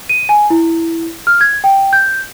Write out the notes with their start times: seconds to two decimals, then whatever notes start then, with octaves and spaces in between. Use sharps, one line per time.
0.09 D#7
0.29 G#5
0.50 E4
1.27 F6
1.41 G#6
1.64 G5
1.93 G6